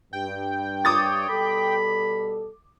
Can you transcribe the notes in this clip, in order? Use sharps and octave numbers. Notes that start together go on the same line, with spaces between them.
G2 G5
C#5 D6 D#6 A6
B2 G3 A4 B5